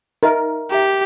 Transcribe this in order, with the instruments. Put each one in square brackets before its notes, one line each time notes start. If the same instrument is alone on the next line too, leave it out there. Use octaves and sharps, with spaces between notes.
[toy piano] D#4 D#5 E5 [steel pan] A#4
[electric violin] G4 [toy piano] E5 G#5 A#5